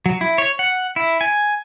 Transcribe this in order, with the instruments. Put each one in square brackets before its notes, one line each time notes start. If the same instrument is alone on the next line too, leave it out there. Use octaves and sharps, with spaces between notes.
[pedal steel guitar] F#3
E4
C#5
F#5
E4
G#5